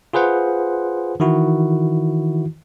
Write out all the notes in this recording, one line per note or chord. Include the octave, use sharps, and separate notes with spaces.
F4 G#4 B4 C5 F#5
D#3 E3 E4 F#4